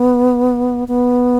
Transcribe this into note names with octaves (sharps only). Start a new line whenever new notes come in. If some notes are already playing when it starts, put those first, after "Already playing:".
Already playing: B3
B3